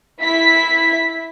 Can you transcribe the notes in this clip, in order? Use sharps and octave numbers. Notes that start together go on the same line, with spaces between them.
E4 B6